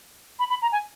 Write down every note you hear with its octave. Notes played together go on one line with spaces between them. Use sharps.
B5
B5
A#5
G#5